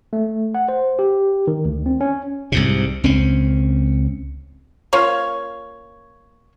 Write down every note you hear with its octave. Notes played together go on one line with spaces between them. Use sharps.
A3
F#5
C5
G4
D#3
D2
C4
C#4
C2 G#2 C3
C#2 C4 C#4
A#3 C#4 F4 C#5